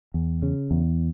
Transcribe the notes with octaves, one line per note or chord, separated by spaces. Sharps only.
E2
C#3
E2